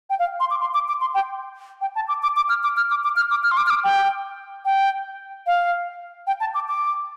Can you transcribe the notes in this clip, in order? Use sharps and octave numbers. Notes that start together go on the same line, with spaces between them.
G5
F5
C6
D6
C6
D6
D6
C6
G5
G5
A5
D6
D6
D6
F6
D6
F6
D6
D6
F6
D6
F6
C6
D6
F6
D6
G5
G5
F5
G5
A5
D6
D6